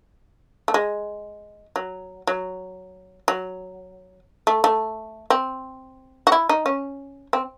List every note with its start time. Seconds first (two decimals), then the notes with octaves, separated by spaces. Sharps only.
0.68 A3
0.74 G#3
1.76 F#3
2.27 F#3
3.28 F#3
4.47 A3
4.64 A3
5.30 C4
6.27 F#4
6.32 E4
6.49 D#4
6.66 C#4
7.33 C4